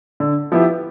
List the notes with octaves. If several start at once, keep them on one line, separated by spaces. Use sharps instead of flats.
D3
F3 B3 E4 G4